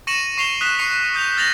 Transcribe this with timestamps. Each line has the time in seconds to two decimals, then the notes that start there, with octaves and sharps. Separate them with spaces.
0.07 C#6 A#6 C#7 D#7 E7 F#7
0.38 C#6 C7 F7 G7
0.61 D#6 F#6 B6 E7 F7
0.78 C#6 C7 C#7 D#7 F7
1.14 D#6 G6 B6 F7
1.37 F6 G6 A6 A#6 F7 F#7